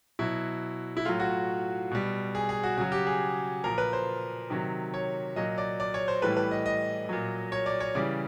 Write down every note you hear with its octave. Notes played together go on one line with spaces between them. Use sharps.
B2 F#3 E4
E4
A2 F#3 F4
F#4
B2 G3
G#4
G#4
F#4
C#3 F#3 F#4
G4
G#4
A#2 F3 A#4
B4
C5
C3 D#3 F#3
C#5
A#2 F#3 D#5
D5
D5
C#5
C5
A2 E3 G3 B4
B4
D#5
D#5
A#2 F#3
C#5
D5
C#5
C#3 E3 G3 D5